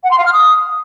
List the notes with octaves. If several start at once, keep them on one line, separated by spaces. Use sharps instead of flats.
F#5
C6
F5
F6
D#6